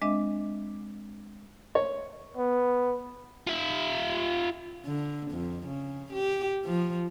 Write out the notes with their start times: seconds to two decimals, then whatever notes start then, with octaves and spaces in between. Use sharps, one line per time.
0.02 G#3 C4 D4 D#5 E5 D6
1.75 C#5
2.37 B3
3.47 F4 E5
4.85 D3
5.32 F2
5.67 C#3
6.13 G4
6.65 F3